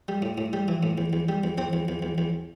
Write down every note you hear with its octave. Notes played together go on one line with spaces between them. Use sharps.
G3
A2
A2
G3
E3
A2
E2
E2
G3
E2
E2 C4
E2
E2
E2
E2